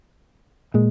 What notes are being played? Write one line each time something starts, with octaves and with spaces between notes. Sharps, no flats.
A#2 G#3